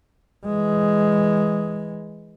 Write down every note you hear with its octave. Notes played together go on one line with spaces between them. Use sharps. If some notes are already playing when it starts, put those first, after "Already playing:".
E3 G#3